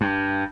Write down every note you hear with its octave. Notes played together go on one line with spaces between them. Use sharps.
G2